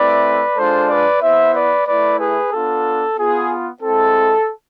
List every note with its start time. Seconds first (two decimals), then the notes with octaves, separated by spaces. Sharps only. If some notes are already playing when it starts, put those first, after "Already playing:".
Already playing: A3 C4 E4 B4 D5
0.56 G#3 D4 F4 A4 C5
0.88 B4 D5
1.21 B3 E4 C5 E5
1.54 B4 D5
1.86 A3 E4 B4 D5
2.19 G#4 B4
2.51 B3 D4 F4 A4
3.17 B3 F4 G#4
3.82 G#3 C4 E4 A4